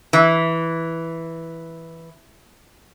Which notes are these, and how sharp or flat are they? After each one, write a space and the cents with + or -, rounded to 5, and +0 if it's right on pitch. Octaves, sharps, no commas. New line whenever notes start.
E3 -5